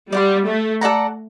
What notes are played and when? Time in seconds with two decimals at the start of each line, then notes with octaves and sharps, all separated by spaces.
0.12 G3 D5 F#5 C6
0.46 A3
0.81 A4 D5 F#5 A#5